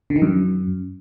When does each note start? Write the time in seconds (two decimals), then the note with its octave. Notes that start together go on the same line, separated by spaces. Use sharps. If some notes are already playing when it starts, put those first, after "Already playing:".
0.10 D3
0.16 D#3
0.22 F#2